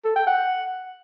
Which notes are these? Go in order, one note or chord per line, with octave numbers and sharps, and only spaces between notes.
A4
G5
F#5